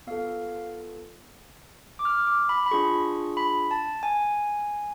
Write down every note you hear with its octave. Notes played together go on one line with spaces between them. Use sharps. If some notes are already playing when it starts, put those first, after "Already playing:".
B3 F4 A4 F5
D6
F6
D6
B5
B5
D4 F4 G#4 C#6
B5
A5
G#5